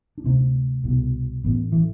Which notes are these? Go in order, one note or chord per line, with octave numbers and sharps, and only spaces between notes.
D4
D2 C3 C4
C2 B2
A1 A2 B3
E3